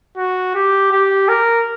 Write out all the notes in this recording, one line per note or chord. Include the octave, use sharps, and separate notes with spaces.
F#4
G4
G4
A#4